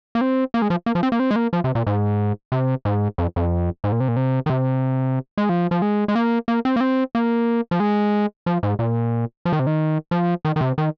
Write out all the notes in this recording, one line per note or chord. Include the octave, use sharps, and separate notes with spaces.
A#3
C4
A#3
G#3
F3
A#3
F3
C4
A#3
C4
G#3
A#3
F3
C3
A#2
G#2
C3
G#2
F2
F2
G#2
A#2
C3
A#2
C3
D#3
C3
G#3
F3
F3
G#3
G#3
A#3
A#3
C4
A#3
C4
A#3
F3
G#3
F3
G#2
A#2
F3
D#3
C3
D#3
F3
D#3
D#3
C3
D#3